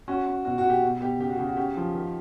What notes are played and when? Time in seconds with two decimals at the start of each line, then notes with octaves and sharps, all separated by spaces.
0.08 C#4 F#4
0.27 C#4
0.45 B2 F#4
0.58 F#4
0.63 B2
0.70 G4
0.83 B2
1.01 B2 G4
1.19 C#3 G4
1.29 F#4
1.38 C#3 G4
1.47 F#4
1.57 C#4 G4
1.77 F3
1.95 D#3